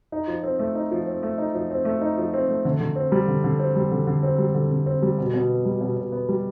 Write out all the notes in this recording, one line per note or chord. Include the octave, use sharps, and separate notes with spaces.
D#4
F3
C4
A3
D#4
F3
C4
A3
D#4
F3
C4
A3
D#4
F3
C4
A3
D3
D3
C4
G3
D3
D3
C4
G3
D3
D3
C4
G3
D3
D3
C4
G3
B2
B2
B3
G3
B2
B2
B3
G3